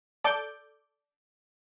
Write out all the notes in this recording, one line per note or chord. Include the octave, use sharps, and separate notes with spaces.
A4 D5 D6 G6